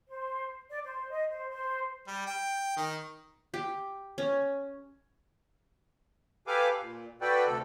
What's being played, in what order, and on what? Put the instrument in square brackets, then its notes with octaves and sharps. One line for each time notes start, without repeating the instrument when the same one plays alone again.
[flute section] C5
D5
C5
D#5
C5
C5
[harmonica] G3
G5
D#3
[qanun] G4
C#4
[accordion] G4 A4 B4 F5 G#5 D6
A#2
F#4 A4 B4 D5 G5
D2 C3 A4